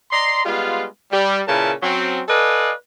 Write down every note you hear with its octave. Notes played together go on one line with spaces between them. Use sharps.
D5 D#5 A#5 C6
G3 G#3 B3 F4
G3
A#2 C#3 E4 A#4 B4 A5
F#3 C4 C#4
A4 B4 D5 D#5 F5 G#5